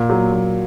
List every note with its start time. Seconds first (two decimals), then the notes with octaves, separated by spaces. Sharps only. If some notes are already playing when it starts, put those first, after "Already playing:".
Already playing: A#2
0.10 F#3
0.32 F#3